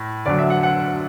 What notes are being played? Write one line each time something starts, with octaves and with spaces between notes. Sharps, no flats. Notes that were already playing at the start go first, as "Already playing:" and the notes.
Already playing: A2
D2 D3 F#3 D5
E5
F#5
F#5